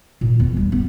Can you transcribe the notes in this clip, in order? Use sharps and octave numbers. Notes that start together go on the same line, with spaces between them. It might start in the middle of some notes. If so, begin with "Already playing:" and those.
A#2
E2
G3
B3